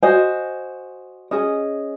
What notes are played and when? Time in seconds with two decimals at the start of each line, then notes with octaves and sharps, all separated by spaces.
0.02 F#4 C5 D#5 G#5
1.31 C#4 G#4 D#5